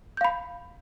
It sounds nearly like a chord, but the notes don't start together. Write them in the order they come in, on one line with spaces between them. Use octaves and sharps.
G6 F5 B5